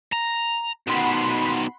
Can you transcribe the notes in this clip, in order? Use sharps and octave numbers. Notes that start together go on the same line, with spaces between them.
A#5
B2 D#3 F#5 B5 C6